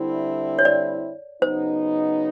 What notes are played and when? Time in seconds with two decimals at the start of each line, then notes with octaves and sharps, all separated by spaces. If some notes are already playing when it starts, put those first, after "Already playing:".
Already playing: D3 G3 C4 E4
0.59 C#5
0.65 D5
1.42 C#3 F#3 B3 D#4 C5